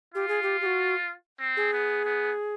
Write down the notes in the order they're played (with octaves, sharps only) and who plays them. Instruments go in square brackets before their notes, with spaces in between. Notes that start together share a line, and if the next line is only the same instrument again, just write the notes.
[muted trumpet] F4 [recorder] G4
[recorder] G#4
G4
G4
F#4
[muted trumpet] C4
[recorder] G#4
[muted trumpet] B3
B3